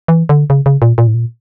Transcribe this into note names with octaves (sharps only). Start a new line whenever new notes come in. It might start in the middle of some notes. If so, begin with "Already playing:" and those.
E3
D3
C#3
C#3
A#2
A#2
A2
A#2